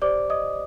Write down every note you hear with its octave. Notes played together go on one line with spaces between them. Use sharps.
G4 C5 D5 D6
D#5 D#6